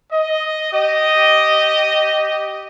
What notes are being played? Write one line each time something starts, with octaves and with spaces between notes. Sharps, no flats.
D#5
G4 D#5